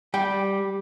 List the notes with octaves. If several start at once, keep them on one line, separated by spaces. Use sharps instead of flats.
G3 G5